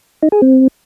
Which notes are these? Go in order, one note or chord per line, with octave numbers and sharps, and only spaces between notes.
D#4
G#4
C4